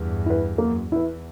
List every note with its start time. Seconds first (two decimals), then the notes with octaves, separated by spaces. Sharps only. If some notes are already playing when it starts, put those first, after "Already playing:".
Already playing: E2 G2
0.26 E4 B4
0.58 F#2 A#3
0.92 E2 E4 B4